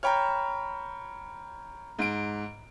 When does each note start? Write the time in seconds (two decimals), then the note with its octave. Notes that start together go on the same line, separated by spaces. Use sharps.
0.03 C#5 G5 A#5 B5 F6
1.99 G#2 D7